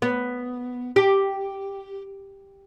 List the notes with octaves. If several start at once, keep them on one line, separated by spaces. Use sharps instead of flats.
B3
G4